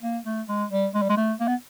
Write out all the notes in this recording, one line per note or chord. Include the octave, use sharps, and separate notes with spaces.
A#3
A3
G#3
G3
G#3
G3
G#3
A3
A#3
B3